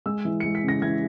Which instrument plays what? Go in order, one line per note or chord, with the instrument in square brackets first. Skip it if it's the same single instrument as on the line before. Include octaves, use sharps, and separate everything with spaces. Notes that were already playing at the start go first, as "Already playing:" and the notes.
[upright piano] G#3 E6
E3
G#3 C#7
B6
C#3
A#6
E3 G#6